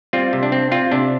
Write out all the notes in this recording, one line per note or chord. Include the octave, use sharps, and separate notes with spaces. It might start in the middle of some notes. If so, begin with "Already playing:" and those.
G3 C4 F4
C3
D4
C4
C4 F4
C3 D4